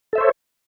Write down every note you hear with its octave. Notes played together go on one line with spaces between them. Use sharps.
A4 C5 C#5 E5